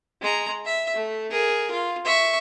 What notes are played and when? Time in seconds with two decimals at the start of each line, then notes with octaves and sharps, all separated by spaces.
0.22 G#3 A#5
0.65 E5
0.95 A3
1.31 G#4 A#4
1.71 F4
2.05 E5 C#6